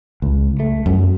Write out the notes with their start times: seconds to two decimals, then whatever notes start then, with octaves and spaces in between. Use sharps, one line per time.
0.22 C#2
0.60 A3
0.86 F#2